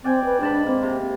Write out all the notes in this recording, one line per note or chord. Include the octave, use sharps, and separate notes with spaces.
C4 D5 G5 G#5
B4
G#2 D4 A5 B5
A#3 C4
C3